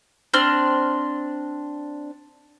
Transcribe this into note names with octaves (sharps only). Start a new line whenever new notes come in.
C4 D4 C6 F6